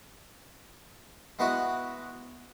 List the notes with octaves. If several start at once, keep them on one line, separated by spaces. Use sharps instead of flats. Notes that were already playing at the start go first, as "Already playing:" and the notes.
G#3 B3 E4 F#4